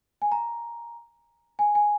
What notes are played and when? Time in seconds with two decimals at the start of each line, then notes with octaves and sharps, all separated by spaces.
0.22 G#5
0.32 A#5
1.59 G#5
1.75 G#5